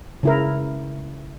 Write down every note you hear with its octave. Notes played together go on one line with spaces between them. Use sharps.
C#3 E4 A#4